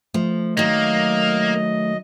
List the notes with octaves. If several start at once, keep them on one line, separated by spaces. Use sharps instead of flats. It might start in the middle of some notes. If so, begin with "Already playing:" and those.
F3 A3
D#3 F#3 A#3 D#5